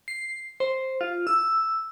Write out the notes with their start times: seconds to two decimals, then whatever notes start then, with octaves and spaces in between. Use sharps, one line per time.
0.08 C7
0.60 C5
1.01 F4
1.27 E6